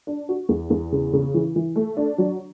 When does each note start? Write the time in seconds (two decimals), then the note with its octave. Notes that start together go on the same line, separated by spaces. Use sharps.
0.07 D4
0.29 F#4
0.49 E2
0.70 E2
0.92 C#3
1.13 C#3
1.34 E3
1.56 E3
1.76 A3
1.97 D4
2.18 F#3